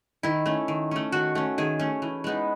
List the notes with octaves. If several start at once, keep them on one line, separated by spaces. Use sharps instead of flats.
D#3 E4
A3 C#4
D#3
A3 C#4
D#3 F#4
A3 C#4
D#3 G#4
A3 C#4
E3
G#3 B3 D#4